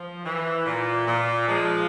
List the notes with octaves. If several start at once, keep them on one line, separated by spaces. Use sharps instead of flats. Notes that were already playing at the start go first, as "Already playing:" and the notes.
Already playing: F3
E3
A#2
A#2
F3 G#3